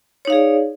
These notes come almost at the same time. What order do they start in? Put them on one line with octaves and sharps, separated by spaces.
C#5 D#4 F5 G#4 D5